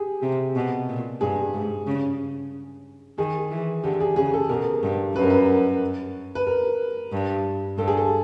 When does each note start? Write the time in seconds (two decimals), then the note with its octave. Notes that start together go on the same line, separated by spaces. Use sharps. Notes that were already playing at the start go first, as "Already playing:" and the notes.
Already playing: G4 G#4
0.22 C3
0.55 B2
0.89 A#2
1.21 G2 G#4
1.53 G#2
1.87 C#3
3.18 D#3 G#4
3.51 E3
3.84 D3 G4
4.00 G#4
4.16 C#3 G#4
4.34 A4
4.49 B2 A#4
4.83 G2
5.15 F#2 B4
5.23 A#4
5.30 B4
6.35 B4
6.47 A#4
7.12 G2
7.78 G2 A4
7.88 G#4
7.97 A4